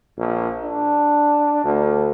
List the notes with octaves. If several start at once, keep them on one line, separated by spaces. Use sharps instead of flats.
A#1
D4
D2